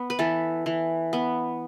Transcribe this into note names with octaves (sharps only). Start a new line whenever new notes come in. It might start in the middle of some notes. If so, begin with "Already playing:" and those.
Already playing: B3
B4
E3 A4
E3
B3